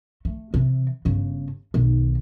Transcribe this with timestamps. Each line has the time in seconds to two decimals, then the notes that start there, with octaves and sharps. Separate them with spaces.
0.25 A3
0.54 C3 E3
1.05 G1 C#3
1.74 B1 D#3